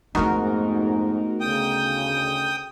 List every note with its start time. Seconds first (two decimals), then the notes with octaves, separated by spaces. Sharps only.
0.15 A#1 F2 G#2 A3 B3 D#4 F#4 A#4
1.41 D2 C#3 G5 D#6